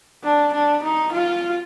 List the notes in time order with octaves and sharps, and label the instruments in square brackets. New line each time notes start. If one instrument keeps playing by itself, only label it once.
[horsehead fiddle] D4
D4
D#4
F4